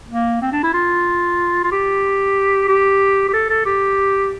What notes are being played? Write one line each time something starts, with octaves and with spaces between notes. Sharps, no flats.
A#3
C4
D4
E4
F4
F4
G4
G4
G4
A4
A4
G4